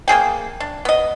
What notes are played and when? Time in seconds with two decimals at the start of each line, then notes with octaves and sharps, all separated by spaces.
0.08 A#3 D4 G#4 G5
0.60 D4
0.85 B3 D#5